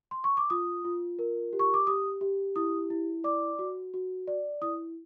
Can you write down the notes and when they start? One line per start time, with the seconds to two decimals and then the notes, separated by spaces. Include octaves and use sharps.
0.11 C6
0.24 C#6
0.37 D6
0.50 F4 D#6
0.85 F4
1.19 A#4
1.53 G4
1.59 C#6
1.74 D6
1.87 G4 D#6
2.21 G4
2.56 E4 D#6
2.90 E4
3.24 D5 D6
3.59 F#4
3.94 F#4
4.28 D5
4.62 E4 D#6